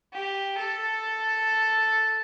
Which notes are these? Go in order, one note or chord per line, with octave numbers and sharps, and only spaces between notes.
G4
A4